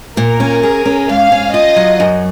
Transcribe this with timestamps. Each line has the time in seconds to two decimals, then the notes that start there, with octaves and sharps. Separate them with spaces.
0.17 A#2 A#4
0.40 C#4
0.63 G#4
0.86 C#4
1.09 G#2 F5
1.32 C#4
1.54 F4 D#5
1.76 F#3
2.00 F#2